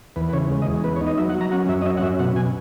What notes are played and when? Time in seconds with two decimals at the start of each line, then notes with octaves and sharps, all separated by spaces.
0.16 E2 B4
0.29 B4
0.33 C#3 C#5
0.50 G#3
0.62 D#5
0.67 E2
0.84 B3 B4
0.96 C#5
1.01 D#4
1.07 D#5
1.18 F#3 E5
1.29 F#5
1.35 F#3
1.41 A#5
1.51 C#4 F#5
1.68 F#2 E5
1.82 D#5
1.85 C#4 E5
1.97 F#5
2.03 F#2 E5
2.19 B2 F#5
2.36 B2 G#5